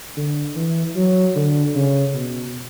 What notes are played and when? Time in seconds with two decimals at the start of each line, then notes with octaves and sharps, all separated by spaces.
0.17 D3
0.56 E3
0.96 F#3
1.36 D3
1.75 C#3
2.15 B2